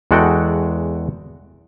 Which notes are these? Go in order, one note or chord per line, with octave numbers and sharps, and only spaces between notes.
E2 G#3 F#4 A4 F#5 G5